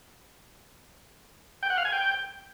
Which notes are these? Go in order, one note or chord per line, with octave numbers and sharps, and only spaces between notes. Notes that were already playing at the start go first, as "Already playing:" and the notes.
G5
F#5
F5
G#5
G5